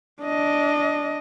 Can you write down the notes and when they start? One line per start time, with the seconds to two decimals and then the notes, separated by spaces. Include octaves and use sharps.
0.22 D4 D#5